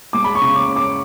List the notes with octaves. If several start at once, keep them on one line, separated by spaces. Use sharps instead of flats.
G#3 D6
B5
C#6
C#3
D6
C#4
D6